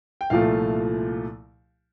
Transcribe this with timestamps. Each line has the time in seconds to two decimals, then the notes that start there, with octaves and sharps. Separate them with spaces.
0.21 G5
0.30 C2 A#2 F3 A3 F5